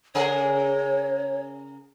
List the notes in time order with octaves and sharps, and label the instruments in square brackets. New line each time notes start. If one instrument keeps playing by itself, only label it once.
[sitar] C#3 G#4 A#4 [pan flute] C#5